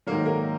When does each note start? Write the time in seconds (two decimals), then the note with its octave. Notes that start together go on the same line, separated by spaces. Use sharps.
0.07 G#2 D#3 F#3 A#3 A#4
0.25 A#3 A#4